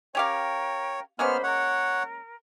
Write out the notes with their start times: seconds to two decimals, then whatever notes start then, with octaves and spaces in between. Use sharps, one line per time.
0.15 C#4 G4 A#4 C#5 F5 G5
1.19 G#3 A#3 B3 C#4 C5 B5 C6 F6
1.43 A#4 C#5 F#5